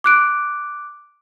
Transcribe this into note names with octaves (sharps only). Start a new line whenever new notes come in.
D6 F#6 D7